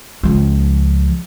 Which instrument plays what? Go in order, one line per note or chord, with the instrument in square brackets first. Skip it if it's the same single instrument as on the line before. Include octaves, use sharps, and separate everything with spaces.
[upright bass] C#2 F3